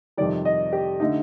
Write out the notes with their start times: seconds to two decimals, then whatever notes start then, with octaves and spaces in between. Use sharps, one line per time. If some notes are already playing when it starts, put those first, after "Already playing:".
0.17 F2 C3 D#3 G3 D5
0.45 D#5
0.73 G4
1.00 D3 A3 D#4